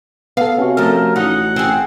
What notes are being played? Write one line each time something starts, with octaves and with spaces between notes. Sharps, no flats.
B3 A4 F5
C3 C#4 F#4
F3 A3 A#4
A1 D#4 F#5
C4 G#4